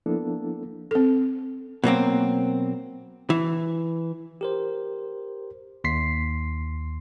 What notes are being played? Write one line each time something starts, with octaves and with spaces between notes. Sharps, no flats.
F3 A#3 B3 D4 E4 A4
C4 A4
B2 F#3 A#3 C4
E3
G4 A#4 C5
D#2 C6 B6 C7